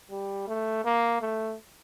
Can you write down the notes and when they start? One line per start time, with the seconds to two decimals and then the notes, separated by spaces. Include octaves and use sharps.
0.10 G3
0.48 A3
0.85 A#3
1.21 A3